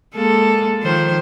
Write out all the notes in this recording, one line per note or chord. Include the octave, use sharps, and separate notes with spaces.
G#3 A#3 A4
D#3 F3 C5